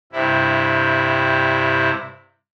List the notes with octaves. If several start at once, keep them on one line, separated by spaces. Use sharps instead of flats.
G2 C3 E4